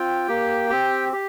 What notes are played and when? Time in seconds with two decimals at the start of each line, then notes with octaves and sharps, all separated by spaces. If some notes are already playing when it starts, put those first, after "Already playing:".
Already playing: C4 F4 G5
0.28 A#3 G4
0.70 C4 G4
1.13 G4